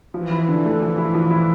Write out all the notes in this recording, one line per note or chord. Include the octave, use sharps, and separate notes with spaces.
E3 F3
E4
D3
A3
F3
E4
F3
E4